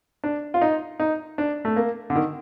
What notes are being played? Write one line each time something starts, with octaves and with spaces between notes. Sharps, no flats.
D4
F4
D#4
D#4
D4
A3
A#3
D3
D#3